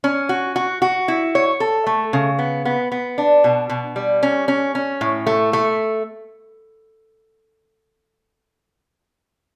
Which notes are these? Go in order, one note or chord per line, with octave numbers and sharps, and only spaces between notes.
C#4
F#4
F#4
F#4
E4
C#5
A4
A3
C#3
B3
B3
B3
D4
B2
B2
G3
C#4
C#4
C#4
A2
A3
A3